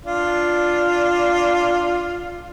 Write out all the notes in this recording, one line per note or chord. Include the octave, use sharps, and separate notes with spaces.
D4 F4